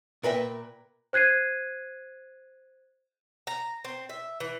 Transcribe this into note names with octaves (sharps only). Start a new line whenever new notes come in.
A#2 A#4 B4 E5 G5
C5 F#6 G#6 C7 D#7
A#5
C4
E5
E3